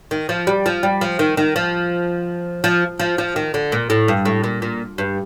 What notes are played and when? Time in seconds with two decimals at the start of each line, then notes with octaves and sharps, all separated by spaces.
0.11 D#3
0.29 F3
0.47 G3
0.66 F3
0.83 G3
1.01 F3
1.19 D#3
1.37 D#3
1.56 F3
2.64 F3
2.99 F3
3.18 F3
3.36 D#3
3.54 D3
3.72 A#2
3.90 A2
4.08 G2
4.25 A2
4.44 A#2
4.62 A#2
4.98 G2